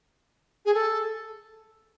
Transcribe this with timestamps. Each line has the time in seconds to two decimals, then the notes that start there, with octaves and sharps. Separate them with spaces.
0.65 G#4
0.74 A4